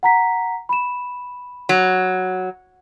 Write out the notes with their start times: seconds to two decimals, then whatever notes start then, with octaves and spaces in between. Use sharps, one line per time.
0.03 F#5 A#5 B6
0.69 B5 E7
1.69 F#3